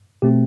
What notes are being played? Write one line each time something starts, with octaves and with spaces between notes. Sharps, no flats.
B2 A3 C4 G4